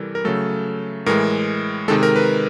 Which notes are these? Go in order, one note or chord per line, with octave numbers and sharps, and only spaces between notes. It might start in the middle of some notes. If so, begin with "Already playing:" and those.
Already playing: C3 E3 G3 A4 A#4
A#4
C#3 F#3 A3 A4
A2 E3 G#3 A#4
C3 D#3 G#3 A4
A#4
B4